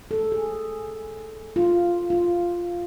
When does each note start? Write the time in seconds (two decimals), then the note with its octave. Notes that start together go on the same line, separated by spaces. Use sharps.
0.11 A4
0.32 G#4
1.56 F4
2.10 F4